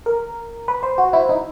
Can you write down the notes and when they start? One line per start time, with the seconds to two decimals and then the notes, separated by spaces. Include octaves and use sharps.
0.06 A#4
0.68 B4
0.83 C5
0.98 F#4
1.13 E4
1.29 D#4